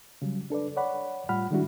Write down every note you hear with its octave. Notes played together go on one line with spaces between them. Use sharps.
C#3 F#3 G3
D4 A4 B4 D5
C#5 D5 F#5 B5
A2 G3 F4 F#5 B5 F6
D#3 G3 G#3 D4 E4 F#4